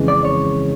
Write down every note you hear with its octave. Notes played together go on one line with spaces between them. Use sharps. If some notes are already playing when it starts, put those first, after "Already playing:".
Already playing: F2 C#3 E3 G#3
D5
C#5